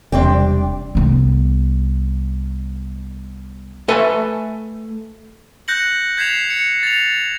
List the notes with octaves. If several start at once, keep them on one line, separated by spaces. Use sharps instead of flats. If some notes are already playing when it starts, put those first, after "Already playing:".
E1 C3 G3 C4 D4 G5
C2 B3
A3 A4 B4 E5 G#5 A5
F#6 G6 A#6 C#7 F#7
G6 G#6 B6 C7 E7 F7
C#7
A6 F7